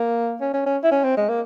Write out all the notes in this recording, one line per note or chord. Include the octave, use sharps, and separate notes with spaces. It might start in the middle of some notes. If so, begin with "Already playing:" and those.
Already playing: A#3
C#4
C#4
C#4
E4
C#4
C4
G#3
A#3